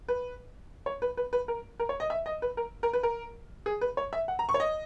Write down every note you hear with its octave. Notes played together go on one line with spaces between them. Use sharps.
B4
C#5
B4
B4
B4
A#4
A#4
C#5
D#5
E5
D#5
B4
A#4
A#4
B4
A#4
G#4
B4
C#5
E5
F#5
A#5
C#6
C#5
D#5